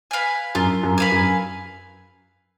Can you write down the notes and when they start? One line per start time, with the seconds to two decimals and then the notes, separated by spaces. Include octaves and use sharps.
0.11 B4 F5 G#5
0.55 F#2 F4
0.83 F#2
0.98 B4 F5 G#5
1.12 F#2